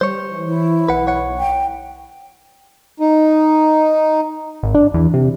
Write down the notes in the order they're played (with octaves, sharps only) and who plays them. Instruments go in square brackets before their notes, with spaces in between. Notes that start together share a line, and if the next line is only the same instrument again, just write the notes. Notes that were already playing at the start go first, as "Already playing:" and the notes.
[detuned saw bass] G3 [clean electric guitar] C5 C#5
[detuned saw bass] E3
[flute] E4
[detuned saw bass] B1 [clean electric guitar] B4 F#5
[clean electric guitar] C#5 F#5
[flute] G5
[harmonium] D#4
[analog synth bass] G#1
D4
E2
C3